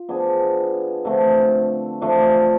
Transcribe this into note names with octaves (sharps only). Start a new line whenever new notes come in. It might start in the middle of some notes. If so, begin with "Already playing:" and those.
Already playing: F4
F3 B3 D4 G#4
D3 F3 A3 C4
F3 A3 D4